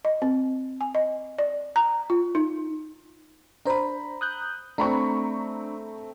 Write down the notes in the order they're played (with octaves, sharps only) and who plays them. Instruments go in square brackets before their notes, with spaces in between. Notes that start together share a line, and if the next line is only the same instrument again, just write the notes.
[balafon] D#5
C4
G#5
D#5
D5
A#5
F4
D#4
[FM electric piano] D4 C5 [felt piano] A#5 B5
[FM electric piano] D#6 F#6 G6
[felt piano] A3 C4 [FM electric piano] D4 [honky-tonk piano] A#5 B5 C#6